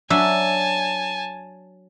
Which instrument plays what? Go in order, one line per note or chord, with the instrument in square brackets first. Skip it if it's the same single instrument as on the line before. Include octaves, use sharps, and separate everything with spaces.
[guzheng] F#3 D4 E5 [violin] G#5 A5